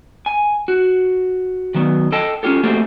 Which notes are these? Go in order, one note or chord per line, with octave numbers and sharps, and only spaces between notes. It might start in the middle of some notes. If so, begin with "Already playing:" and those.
G#5
F#4
D#3 F#3 B3
A4 D#5 G5 A5
C#4 D4 F4 G4 A4
A3 A#3 C4 F#4 G4 A4